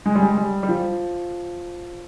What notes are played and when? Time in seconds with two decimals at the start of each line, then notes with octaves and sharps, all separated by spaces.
0.06 G#3
0.15 G3
0.23 G#3
0.37 G3
0.63 G3
0.69 F3